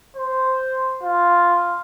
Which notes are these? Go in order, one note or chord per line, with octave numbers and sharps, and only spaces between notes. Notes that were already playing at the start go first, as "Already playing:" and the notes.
C5
F4